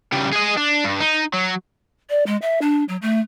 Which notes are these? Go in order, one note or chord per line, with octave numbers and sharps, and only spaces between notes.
C#3 G3
G#4 D#5
D4
G2
D#4
F#3
D5
G#3
E5
D4
F#3
A3